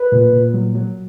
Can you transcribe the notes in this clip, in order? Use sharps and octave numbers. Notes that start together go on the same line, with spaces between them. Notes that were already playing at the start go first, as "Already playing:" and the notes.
Already playing: B4
A#2
A#2
F#3
F#3